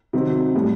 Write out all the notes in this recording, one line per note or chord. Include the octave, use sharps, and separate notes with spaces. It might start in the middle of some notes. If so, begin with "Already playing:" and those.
C3 D#3 F#3 C4
A2 G3